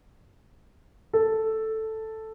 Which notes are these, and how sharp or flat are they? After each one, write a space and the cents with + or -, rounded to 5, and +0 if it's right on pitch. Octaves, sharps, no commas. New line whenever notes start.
A4 +0